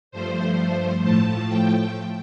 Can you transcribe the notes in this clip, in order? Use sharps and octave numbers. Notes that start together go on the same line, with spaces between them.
G2 F3 A3 C5
A2 F3 A3 A5
G5